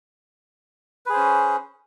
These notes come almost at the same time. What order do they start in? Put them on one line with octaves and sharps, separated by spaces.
B4 G#4 C5 C#4